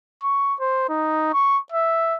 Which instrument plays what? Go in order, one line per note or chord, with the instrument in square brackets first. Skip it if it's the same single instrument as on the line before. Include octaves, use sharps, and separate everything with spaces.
[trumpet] C#6
C5
D#4
C#6
E5